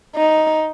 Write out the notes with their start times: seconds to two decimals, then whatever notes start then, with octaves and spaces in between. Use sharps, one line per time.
0.16 D#4